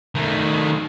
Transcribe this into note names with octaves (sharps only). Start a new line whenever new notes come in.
D#3 A3